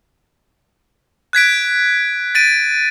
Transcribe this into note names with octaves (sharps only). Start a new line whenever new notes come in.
F#6 G#6 B6 D7
A6 D7 D#7